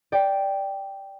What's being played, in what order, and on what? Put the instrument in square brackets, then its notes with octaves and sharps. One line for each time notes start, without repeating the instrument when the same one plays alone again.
[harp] D5 G5